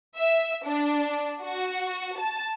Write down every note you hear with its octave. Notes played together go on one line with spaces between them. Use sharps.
E5
D4
F#4
A5